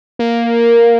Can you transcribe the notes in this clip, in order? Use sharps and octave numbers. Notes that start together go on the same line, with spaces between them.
A#3